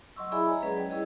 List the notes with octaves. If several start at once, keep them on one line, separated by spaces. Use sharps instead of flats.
F#3 D#5 C6 C#6 E6
E4 G#4 D5 E5 G#5 B5
C#5 D#5 A#5
F#3 G#3 C#4 G#4 B4 D5
B4 D5 G5
G3 C#4 E4 G#4 C#5 D#5